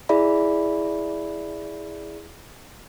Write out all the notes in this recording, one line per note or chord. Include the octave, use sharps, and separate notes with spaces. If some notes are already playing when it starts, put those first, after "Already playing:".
E4 G#4 D5 E5 B5